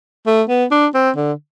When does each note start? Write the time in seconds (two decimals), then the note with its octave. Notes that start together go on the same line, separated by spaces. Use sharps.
0.27 A3
0.49 B3
0.71 D4
0.95 C4
1.17 D3